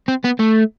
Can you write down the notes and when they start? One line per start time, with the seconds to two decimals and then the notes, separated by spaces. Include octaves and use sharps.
0.08 C4
0.24 B3
0.39 A3